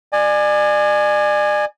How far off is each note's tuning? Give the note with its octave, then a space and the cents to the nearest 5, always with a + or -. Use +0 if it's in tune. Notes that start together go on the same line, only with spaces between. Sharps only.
D5 +35 G#5 +0